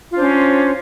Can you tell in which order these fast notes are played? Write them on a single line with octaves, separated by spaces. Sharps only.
F4 D4 C5 C#4